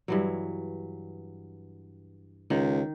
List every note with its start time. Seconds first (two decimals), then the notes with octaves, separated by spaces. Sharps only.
0.08 G2 E3 F#3
2.50 C#2 D#3